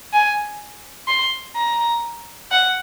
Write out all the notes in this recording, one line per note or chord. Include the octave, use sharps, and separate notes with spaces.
G#5
C6
A#5
F#5